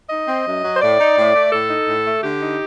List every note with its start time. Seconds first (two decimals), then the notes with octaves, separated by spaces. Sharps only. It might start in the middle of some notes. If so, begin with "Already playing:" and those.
0.10 D#4 D#5
0.27 C4
0.46 F#2
0.63 F#3
0.75 C5
0.81 A2 D5
0.99 D#4
1.17 A2
1.34 A3
1.51 A2 A4
1.69 D#4
1.87 A2
2.05 A3
2.23 D3 G4
2.41 D#4